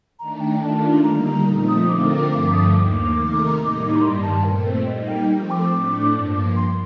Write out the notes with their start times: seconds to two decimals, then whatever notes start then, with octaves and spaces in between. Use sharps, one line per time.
0.19 D#3 A3 D4 A#5
0.40 G5
0.61 D#3 A3 D4 F4 A5
1.04 D3 G3 A#3 D#4 A#5
1.46 A#2 F3 A3 C4 D#4
1.68 D#6
1.89 D3 A3 C4 F4 A#4 D6
2.32 G2 D3 F3 A3 D6
2.53 D#6
2.74 D#2 D#3 A#3 D6
3.17 C3 D#3 A3 D#4 A#4
3.59 A2 G3 A#3 D#4
3.96 A#5
4.01 G2 D#3 G3 C6
4.23 A5
4.44 A#2 A3 C4 A#4
4.66 C5
4.87 G3 A#3 D#4 D#5
5.08 G5
5.29 F3 A3 C4 G5
5.51 D6
5.72 A2 A3 D4
6.14 G2 F3 A#3
6.56 C6